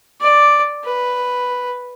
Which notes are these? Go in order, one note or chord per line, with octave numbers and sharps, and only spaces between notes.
D5
B4